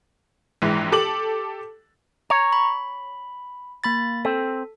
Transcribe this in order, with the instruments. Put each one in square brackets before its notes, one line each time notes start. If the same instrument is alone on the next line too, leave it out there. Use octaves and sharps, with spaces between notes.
[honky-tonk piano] A#1 G#2 E3 G#3
G4 A4 D6 F#7
[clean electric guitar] C#5 [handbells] A#5
[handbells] B5
A#3 B5 A6
[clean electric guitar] C4 [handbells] A4